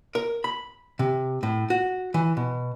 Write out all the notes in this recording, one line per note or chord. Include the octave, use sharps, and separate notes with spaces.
A#4
B5
C3
A2
F#4
E3
B2